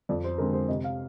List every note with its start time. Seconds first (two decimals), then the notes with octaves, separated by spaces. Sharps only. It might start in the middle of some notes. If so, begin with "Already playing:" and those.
0.09 F2 D5
0.24 C5
0.38 D3 G#3 C4 A#4
0.53 C5
0.68 C3 D#5
0.84 F5